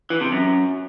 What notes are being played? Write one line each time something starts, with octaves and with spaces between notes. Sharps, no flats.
E3
C3
F#2